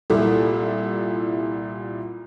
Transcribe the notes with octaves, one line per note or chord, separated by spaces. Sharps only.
C2 A#2 E4 A4